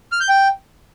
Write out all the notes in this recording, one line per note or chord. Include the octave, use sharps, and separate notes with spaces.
F6
G6
G5